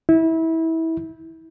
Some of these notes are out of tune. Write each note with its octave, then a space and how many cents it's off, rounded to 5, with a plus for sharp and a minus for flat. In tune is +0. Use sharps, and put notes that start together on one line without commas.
E4 -25